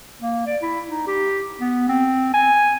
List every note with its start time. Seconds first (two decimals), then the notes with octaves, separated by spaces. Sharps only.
0.22 A#3
0.46 D5
0.62 E4
0.90 D#4
1.07 G4
1.60 B3
1.89 C4
2.34 G#5